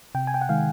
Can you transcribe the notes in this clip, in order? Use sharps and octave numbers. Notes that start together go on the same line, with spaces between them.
C3 G5
G#5
G5
F#5
D#3 G#3 F5